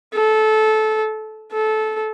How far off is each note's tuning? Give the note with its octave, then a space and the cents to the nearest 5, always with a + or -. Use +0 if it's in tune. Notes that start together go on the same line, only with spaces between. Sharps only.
A4 -20
A4 -20